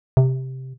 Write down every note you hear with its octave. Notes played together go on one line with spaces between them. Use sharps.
C3